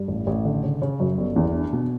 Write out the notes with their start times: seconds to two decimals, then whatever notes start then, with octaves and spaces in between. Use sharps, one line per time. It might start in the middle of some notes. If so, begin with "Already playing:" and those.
Already playing: G2
0.08 A1
0.27 A1
0.45 D3
0.63 C#3
0.82 C#3
1.00 F#2
1.18 G1
1.36 E2
1.55 D4
1.73 B2